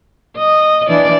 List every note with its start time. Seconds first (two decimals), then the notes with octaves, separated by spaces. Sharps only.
0.37 D#5
0.88 E3 D4 D5